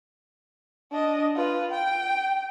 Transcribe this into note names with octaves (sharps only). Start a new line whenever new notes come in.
D4 D#5
F4 B4
G5